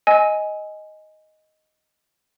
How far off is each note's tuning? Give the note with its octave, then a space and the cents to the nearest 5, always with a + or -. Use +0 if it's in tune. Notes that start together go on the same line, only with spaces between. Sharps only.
D#5 +0 G#5 +0 E6 -35